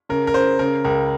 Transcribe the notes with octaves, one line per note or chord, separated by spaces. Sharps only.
C#3 A#4
A#4
C#3 C5
C#3 A#4
C#2 A#4